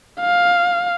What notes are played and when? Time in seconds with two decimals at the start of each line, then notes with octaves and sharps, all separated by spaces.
0.21 F5